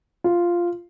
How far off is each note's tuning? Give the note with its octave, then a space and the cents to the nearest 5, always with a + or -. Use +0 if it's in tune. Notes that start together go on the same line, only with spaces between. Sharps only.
F4 -5